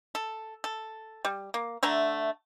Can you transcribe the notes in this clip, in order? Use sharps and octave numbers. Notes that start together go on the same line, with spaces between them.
A4
A4
G3
A#3
D3 A3 E5 A#5